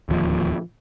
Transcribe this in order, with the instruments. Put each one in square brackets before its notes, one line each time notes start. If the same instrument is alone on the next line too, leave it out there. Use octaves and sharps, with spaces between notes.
[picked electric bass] D1 D#2 F3